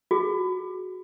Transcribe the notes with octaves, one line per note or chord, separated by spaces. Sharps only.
F#4 G#4